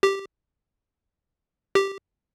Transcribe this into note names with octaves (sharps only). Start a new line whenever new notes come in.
G4
G4